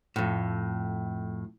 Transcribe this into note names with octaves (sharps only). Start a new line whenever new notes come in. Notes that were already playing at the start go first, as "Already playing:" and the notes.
F2 A2